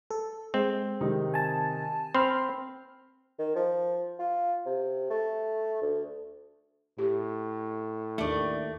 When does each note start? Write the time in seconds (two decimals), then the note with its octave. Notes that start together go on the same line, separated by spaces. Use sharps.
0.11 A4
0.54 G#3 C4
1.01 C3 D#3 D#4
1.34 G#5 A5
2.15 C4 B5 C6 F6
3.39 D#3
3.56 F3
4.20 F4
4.66 C3
5.10 A3
5.82 D2
6.98 A2 G4
8.18 D#2 D#3 A3 D4 D5